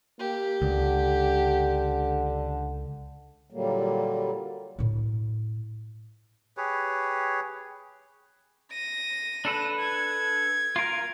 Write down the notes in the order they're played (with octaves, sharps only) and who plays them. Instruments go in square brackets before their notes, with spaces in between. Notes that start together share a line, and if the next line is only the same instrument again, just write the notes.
[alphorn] A#3 [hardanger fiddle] G4
[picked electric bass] C#2 [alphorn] D3
[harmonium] A#2 D3 F#3 G3 A#3
[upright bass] A2 E4
[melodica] G4 G#4 B4 C#5
[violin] A#6 D#7
[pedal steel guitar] D4 A4 B4
[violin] G#6
[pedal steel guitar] F4 A#4